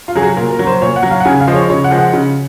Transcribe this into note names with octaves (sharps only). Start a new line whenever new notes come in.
F4
F#3 G#4
F#4
A#2 A#4
A#4
F#3
C5
A#2 C#5
F#5
F#3
F5
F#5
C#3 G#5
F5
F3 G#3
C#5
C#3 C#5
F#5
F3 G#3
F#5
C#3